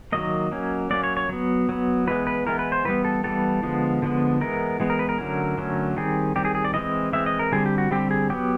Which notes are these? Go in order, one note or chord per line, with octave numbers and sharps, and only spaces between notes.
D#3 F#3 A#3 D#5
F#3 A#3 C#4
F#3 A#3 C#4 D5
C#5
C#5
F#3 B3
F#3 B3
E3 G#3 B3 B4
B4
E3 G#3 B3 A#4
B4
C5
E3 G3 B3 B4
A4
E3 G3 B3 A4
D3 F3 G#3 B3
D3 F3 G#3 B3
E3 G#3 B3 A#4
E3 G#3 B3
A#4
B4
A#4
D3 F#3 A3 C#4
D3 F#3 A3 C#4
D#3 G3 C4 G#4
D#3 G3 C4 G4
G#4
G#4
D5
E3 G#3 C4 D#5
E3 G#3 C4 E5
D#5
A#4
D3 G3 C4 G#4
G4
F#4
D3 G3 C4 G4
G#4
F#3 B3 G4